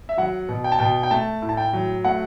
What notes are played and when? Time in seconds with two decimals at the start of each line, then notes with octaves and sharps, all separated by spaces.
0.09 E5
0.17 F#3 F#5
0.49 B2
0.64 G5
0.72 A5
0.79 B2 G5
1.03 G5
1.11 A3 A5
1.42 A2
1.49 A5
1.57 G5
1.73 F#3
2.04 A3 F#5